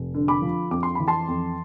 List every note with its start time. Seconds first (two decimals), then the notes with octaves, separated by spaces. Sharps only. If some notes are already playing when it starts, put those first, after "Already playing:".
Already playing: F1
0.14 D3
0.28 B5 D6
0.42 F3
0.71 F2 D6
0.83 C6
0.95 E3 B5
1.08 A5 C6
1.28 F2